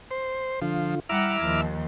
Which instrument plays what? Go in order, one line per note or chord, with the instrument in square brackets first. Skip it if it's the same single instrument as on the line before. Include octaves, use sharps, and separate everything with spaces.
[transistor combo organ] C5
[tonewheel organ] D3 F4 [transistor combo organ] F3
[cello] G3 F#5 [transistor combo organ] E4 E5 [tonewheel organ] A#5 D6 F6
[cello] D#2 F3